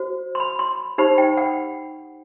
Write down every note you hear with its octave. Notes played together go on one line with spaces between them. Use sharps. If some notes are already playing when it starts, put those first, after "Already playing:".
Already playing: F#4 C5
C6
B5
C6
D#4 G4 C5 B5
G5
F#5